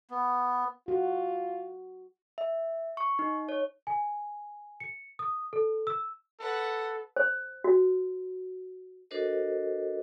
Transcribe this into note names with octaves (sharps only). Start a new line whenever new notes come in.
B3
F4 F#4
E5
C#6
D#4
C#5
G#5
C#7
D#6
A4
E6
A4 B4 F#5
C5
F#4
D4 F#4 A4 A#4 C5 D#5